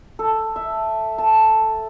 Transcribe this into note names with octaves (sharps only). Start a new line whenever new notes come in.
A4
E5
A5